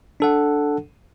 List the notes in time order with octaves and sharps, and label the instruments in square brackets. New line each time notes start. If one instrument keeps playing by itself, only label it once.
[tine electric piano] D4 A4 F#5